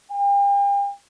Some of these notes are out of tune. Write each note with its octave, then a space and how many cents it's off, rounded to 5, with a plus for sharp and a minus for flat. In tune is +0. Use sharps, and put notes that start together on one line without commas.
G5 +40